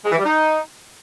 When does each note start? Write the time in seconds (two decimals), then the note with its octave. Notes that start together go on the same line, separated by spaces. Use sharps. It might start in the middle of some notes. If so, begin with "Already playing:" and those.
0.05 G#3
0.11 E3
0.18 G3
0.25 D#4